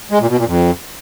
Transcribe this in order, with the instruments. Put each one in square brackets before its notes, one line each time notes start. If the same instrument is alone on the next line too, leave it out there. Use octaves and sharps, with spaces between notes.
[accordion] G#3
A#2
B2
A#2
F2